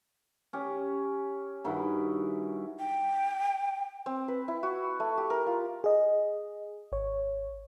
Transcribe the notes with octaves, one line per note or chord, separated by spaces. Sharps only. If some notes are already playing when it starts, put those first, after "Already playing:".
C#4 G4
G2 D#3 E4 F#4
G5
C4
B4
E4
F#4
A3
G4
A#4
F4
G#4 D#5
G#1 C#5